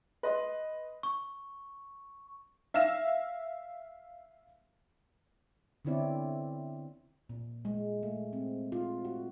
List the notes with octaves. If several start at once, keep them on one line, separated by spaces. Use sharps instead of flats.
B4 D#5 C6
C#6
E5 F5 F6 A#6 E7
D3 B3 C4 E4 C#5 D5
A#2
G#3
A3
C4
F4
F#4